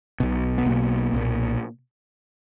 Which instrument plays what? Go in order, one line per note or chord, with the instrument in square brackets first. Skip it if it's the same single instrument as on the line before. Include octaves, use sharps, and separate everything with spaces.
[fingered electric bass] B1 B2
B3
B1 B2 A#3
B1 A#2